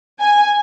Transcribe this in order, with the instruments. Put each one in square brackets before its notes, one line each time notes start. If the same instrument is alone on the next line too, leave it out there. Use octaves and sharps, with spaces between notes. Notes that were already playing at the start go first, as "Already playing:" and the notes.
[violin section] G#5